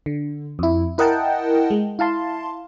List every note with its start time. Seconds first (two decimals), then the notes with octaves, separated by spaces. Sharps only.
0.06 D3
0.59 F2 E4
0.98 E4 A#4 D#5 F#5 G5 A5
1.70 G#3
1.99 E4 F5 A5 C6